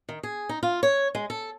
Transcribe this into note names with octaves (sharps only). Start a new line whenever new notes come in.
D#3
G#4
D#4
F4
C#5
G#3
A4